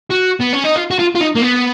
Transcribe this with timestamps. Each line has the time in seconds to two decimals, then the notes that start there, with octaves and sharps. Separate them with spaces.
0.11 F#4
0.41 B3
0.53 C#4
0.64 D#4
0.76 F4
0.91 F#4
0.99 F4
1.15 F4
1.21 D#4
1.35 A#3
1.42 B3